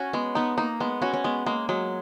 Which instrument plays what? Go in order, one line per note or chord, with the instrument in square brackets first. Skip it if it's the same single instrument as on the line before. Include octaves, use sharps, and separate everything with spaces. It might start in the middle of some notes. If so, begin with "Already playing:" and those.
Already playing: [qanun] C#4 [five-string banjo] F#4
[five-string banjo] G#3 [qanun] B3
[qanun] B3 [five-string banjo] D#4
[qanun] A#3 [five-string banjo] D#4
[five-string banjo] G#3 [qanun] B3
[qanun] C#4 [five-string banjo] F#4
[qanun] C#4
[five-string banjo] G#3 [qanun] B3
[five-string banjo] G#3 [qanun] A#3
[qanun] F#3 [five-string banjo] G#3